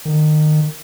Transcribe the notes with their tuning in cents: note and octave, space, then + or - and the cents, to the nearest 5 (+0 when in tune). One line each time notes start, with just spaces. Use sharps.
D#3 -30